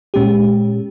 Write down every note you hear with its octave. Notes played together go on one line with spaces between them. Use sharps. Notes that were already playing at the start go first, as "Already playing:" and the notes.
A#2 G#3 C#4 G4